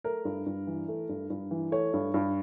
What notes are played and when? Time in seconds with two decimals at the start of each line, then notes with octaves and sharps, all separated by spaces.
0.04 A3 A#4
0.25 G2
0.46 G2
0.67 E3
0.88 A3
1.09 G2
1.30 G2
1.51 E3
1.72 A3 C#5
1.94 G2
2.14 G2